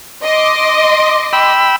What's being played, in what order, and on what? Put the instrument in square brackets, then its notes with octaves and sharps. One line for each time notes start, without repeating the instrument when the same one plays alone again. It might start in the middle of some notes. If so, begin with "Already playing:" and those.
[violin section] D#5 C6 D6
[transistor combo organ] G5 B5 E6